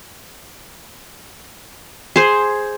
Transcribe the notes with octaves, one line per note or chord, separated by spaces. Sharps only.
G#4 C5